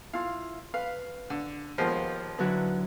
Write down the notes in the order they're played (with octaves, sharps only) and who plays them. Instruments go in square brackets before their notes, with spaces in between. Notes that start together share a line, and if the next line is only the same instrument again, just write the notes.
[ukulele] E4 F4 [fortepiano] F5
[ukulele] B4 [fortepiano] F5
[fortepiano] D3
[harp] D#2 [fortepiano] F3 G#3 B3 [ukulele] F4 A#4 C5
[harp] D3 F#3 E4 [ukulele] F#4 B4